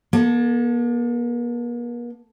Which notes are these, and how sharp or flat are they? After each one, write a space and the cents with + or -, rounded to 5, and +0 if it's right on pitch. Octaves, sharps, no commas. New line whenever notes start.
A#3 +45 A4 +10